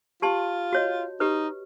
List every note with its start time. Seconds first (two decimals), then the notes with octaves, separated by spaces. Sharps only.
0.22 F4 G4 A5 C6
0.73 F#4 C#5 D#5
1.20 D#4 G4 B4